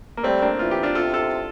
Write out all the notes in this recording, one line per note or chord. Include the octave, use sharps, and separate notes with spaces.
A#3
G3 A3 C4
A#3 D4
E3 F4
G4
D4 F4
C3 F4 A4
F4 A4